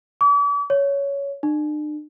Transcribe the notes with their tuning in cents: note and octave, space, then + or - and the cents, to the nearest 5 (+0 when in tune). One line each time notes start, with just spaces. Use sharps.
D6 -40
C#5 +10
D4 +45